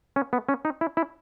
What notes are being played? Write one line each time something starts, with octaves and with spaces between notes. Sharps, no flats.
C#4
B3
C#4
D#4
E4
E4